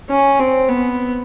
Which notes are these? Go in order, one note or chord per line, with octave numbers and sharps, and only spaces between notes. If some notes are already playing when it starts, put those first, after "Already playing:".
C#4
C4
B3